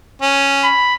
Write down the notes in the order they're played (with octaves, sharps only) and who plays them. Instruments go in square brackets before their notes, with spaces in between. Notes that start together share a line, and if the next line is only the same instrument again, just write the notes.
[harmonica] C#4
[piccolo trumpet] B5